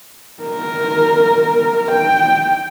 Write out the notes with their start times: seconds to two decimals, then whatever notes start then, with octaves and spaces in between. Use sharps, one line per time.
0.43 A#4
1.92 G5